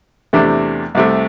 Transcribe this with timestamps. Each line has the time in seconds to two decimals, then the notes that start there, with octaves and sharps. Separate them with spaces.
0.33 E2 C3 A3 D4 G4
0.95 C2 C3 A3